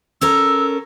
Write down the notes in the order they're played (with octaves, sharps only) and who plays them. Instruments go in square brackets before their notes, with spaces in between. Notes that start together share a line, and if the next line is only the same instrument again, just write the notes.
[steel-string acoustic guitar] C#4 A4 A#4 [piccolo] E6